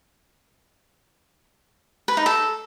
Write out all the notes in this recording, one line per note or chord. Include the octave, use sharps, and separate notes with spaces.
B4
D#4
A4